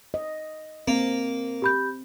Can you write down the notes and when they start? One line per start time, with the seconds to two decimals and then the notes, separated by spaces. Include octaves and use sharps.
0.14 D#5
0.88 A#3 C4
1.62 G4 B5 G6